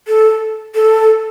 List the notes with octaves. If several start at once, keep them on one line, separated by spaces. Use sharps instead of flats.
A4
A4